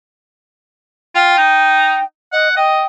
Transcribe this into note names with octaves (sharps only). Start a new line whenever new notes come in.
F4 G5
D#4
D#5 F#5
D#5 G5